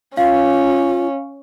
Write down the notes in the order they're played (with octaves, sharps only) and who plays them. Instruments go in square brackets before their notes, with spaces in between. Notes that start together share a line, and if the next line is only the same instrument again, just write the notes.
[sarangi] C#4 [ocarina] F4 [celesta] F5